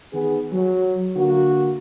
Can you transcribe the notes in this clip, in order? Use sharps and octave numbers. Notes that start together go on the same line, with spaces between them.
D#3 B3 G#4
F#3
D3 A#3 F#4